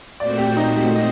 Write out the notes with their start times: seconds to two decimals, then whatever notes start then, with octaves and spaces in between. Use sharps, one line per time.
0.20 A#2 A3 C4 F#4 C5 D5
0.38 G4
0.57 D#4
0.76 G4
0.95 D#5